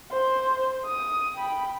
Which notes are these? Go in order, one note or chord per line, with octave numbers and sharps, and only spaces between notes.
C5
D#6
G5 B5